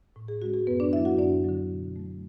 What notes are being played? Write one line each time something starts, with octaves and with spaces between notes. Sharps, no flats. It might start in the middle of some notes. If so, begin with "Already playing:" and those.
A2
G#4
G#3 C#4 F#4
G#4
F#2 B3 B4
D4 D5
D3 F#3 E4 E5
F#4 F#5
F#2 D4 D5
D3 F#3
B2
F#3 A3